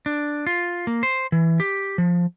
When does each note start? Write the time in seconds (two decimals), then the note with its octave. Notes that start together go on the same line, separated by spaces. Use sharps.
0.06 D4
0.47 F4
0.87 A#3
1.03 C5
1.32 E3
1.60 G4
1.98 F3